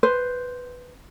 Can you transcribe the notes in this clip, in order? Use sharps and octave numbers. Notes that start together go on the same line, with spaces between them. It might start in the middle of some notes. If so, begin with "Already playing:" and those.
B4 C5